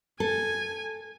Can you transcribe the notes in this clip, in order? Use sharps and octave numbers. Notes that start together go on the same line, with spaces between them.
A4 G#5